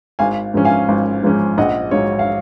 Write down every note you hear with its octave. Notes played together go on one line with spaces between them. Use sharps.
G#1 F5 G#5
G#2 F3 G#3 C#4
F5 G#5
G#1
G#2 F3 G#3 C#4
A#1 D#5 F#5
G#2 F#3 C#5 F5
F5